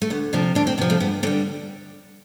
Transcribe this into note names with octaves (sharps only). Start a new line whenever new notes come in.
A3
D2 B3
C3 F3 D4
D2 D4
C4
C3 F3 B3
A3
G2 B3
D3 G3 C4